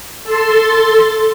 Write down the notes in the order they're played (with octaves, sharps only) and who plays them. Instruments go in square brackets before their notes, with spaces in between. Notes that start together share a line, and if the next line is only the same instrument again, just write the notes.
[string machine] A4 A5 C6